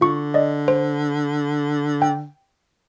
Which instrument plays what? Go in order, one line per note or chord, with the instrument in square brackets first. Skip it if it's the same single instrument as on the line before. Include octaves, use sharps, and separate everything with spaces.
[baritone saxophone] D3 [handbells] F4 C#6
[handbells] D5 D#5
C5
G5